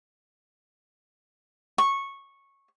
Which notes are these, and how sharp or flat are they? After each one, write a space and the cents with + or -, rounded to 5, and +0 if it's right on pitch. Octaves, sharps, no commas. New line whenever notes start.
C#6 -10